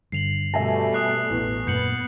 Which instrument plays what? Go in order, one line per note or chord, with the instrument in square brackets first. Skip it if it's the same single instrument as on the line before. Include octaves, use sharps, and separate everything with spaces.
[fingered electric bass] G2 D3 [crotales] C7 F7 F#7
[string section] B2 G3 A3 [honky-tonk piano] E5 G#5 A5 [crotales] A#6
[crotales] D#6 F#6 C7
[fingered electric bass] A1 [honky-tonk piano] E2
[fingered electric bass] F#2 A#2 A#3 [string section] B3 [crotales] G6 C#7 F#7